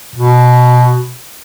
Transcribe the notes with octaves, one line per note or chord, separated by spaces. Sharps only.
B2